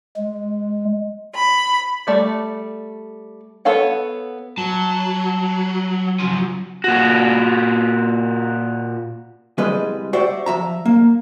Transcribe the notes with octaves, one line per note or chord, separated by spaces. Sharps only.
G#3
B5
G3 A3 D5
B3 A4 C#5 F5 F#5
F#3 A5
C#3 F3
A#2 F#4
C2 G3 G#3 B4 D#5
F#4 G4 C5 D5 E5
F3 E5 A#5
A#3